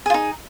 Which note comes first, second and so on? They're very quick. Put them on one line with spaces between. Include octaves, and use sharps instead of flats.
G#4 F4 D#4